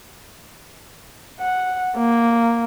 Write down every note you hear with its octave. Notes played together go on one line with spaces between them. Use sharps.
F#5
A#3